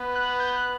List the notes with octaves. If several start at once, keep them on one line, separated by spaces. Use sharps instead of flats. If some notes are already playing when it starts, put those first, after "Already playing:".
Already playing: B3 B4
F#6
G6
F#6